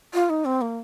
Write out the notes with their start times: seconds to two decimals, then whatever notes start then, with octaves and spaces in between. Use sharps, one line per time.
0.14 F4
0.30 D#4
0.45 C4
0.61 A#3